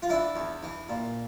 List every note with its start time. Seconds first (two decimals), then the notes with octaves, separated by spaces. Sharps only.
0.02 F4
0.10 E3 D4 E4
0.36 E2
0.63 E3
0.89 A#2